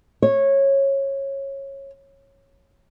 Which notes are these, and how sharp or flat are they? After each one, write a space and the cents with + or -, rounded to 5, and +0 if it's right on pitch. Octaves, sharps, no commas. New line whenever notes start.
C#5 -20